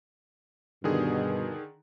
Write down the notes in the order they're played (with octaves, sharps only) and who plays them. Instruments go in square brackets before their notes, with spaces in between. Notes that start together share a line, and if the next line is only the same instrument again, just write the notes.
[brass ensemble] G2 B2 [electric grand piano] D3 D#3 G#4